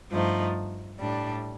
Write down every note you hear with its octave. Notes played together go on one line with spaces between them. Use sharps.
G2 F3 A3 D#4
A2 G3 D4